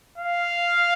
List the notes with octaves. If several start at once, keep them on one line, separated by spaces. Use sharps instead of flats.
F5